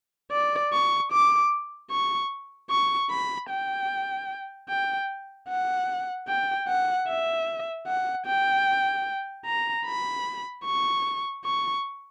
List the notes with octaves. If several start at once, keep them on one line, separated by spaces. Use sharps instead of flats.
D5
C#6
D6
C#6
C#6
B5
G5
G5
F#5
G5
F#5
E5
F#5
G5
A#5
B5
C#6
C#6